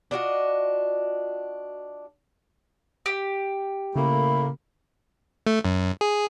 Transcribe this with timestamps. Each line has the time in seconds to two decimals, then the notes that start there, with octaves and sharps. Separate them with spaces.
0.11 D4 F4 F#4 D#5
3.06 G4
3.96 A2 C#3 A3 A#3 B5
5.47 A3
5.65 F#2
6.01 G#4